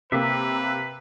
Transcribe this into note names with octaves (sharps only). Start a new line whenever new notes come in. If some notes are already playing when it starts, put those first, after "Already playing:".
C3 A#3 B4 E5